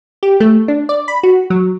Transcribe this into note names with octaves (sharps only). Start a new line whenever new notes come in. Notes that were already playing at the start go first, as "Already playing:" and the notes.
G4
A3
D4
D5
B5
F#4
F#3